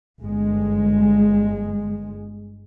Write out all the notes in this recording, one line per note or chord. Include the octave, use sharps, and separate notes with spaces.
G1 G#3